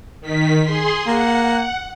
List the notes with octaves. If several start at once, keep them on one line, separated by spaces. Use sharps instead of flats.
D#3 B6
G#4 C6
A#3 F#5